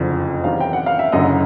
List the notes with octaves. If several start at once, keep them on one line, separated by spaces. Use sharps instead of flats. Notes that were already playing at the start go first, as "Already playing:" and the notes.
Already playing: F#1 F2 D3 F3
E2 C3 D#3 F#3 F5
G5
F#5
F5
E5
F#1 F#2 D3 F#3 D#5